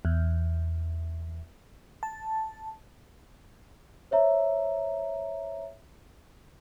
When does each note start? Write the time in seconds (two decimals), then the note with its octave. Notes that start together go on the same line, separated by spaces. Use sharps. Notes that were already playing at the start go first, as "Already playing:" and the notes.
0.05 E2
2.03 A5
4.11 C5 C#5 E5 A#5